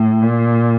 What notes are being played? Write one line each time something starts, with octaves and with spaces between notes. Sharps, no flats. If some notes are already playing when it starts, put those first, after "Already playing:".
Already playing: A2
A#2